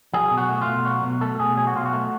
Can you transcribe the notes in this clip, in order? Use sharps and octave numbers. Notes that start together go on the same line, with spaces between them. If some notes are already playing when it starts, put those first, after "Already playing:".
F#3 G#4
B2
F#4
A3
F4
B2
F#3 F#4
B2
A3 A4
B2 G#4
F#3 G#4
F#4
B2 F4
F#4
A3